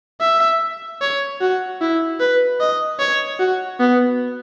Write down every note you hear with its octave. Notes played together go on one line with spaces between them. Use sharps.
E5
C#5
F#4
E4
B4
D#5
C#5
F#4
B3